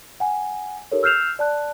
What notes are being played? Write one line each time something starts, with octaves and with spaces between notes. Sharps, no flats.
F#5 G#5
D#4 G4 A4 A#4 C#5
E6 F6 G6 C7 E7 F7
D5 A5 F#6